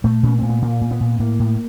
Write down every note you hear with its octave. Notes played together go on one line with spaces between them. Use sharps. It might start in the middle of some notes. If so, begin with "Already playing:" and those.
A#2 A3
A#2 C#4
A#2 C4
B3
A#2 A#3
A#2
B3
A#2
A2 A#3
A2